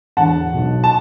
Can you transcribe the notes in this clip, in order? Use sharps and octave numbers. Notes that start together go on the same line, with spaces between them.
E1 E2 D3 F#5 A5
B1 B2
A5